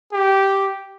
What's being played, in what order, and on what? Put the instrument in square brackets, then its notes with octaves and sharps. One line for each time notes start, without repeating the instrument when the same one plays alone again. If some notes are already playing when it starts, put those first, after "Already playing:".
[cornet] G4